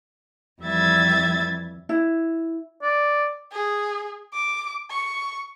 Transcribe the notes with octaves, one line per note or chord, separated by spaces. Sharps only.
F2 E3 G3 E5 G#6 A6
E4
D5
G#4
D6
C#6